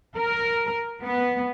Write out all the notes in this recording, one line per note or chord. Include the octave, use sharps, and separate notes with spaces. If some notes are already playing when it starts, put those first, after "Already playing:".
A#4
B3